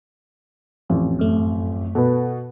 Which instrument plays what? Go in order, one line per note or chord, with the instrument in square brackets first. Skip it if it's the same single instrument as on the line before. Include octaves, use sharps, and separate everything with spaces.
[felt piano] A1 F2
[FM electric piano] F#2 A3
[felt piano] B2 [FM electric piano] A4 B4